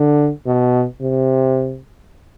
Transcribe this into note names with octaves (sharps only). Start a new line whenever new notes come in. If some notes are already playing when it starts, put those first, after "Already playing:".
Already playing: D3
B2
C3